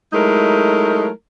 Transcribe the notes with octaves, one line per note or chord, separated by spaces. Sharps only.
F#3 G#3 A3 D#4 E4 A#4